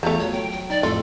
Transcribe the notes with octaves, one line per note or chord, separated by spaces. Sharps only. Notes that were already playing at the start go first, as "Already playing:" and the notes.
E2 F3 A3 A#5
F#3 C#5
G5
G5
D#4 D5
F2 A2 F4 A4